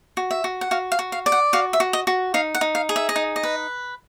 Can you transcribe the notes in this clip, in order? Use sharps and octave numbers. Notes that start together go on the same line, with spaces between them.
F#4
E5
F#4
F#5
F#4 F5
F5
F#4
F5
D5
F#5
F#4 F5
E5
F#4
D#5
F#4
D#4 F5
F#5
D#4
F5
G#4
E5
D#5
D#4
D#5
B4